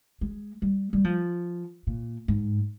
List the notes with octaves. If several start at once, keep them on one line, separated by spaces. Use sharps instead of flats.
G#3
G3
G3
F3
A#2
G#2